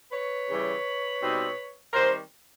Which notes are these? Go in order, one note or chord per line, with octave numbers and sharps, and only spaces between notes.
B4 C#5
C#3 E3 G3
B2 G3 C4 D#4
D#3 G3 C4 A#4 C5